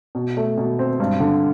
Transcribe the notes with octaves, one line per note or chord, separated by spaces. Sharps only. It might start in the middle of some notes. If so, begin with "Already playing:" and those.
B2
A3
B2
C4
G2
D3